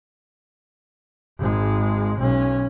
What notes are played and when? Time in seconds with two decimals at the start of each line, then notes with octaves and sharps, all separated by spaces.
1.39 G#1 G#3
2.20 B1 C#4